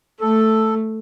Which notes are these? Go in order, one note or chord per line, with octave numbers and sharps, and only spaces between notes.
A3 A4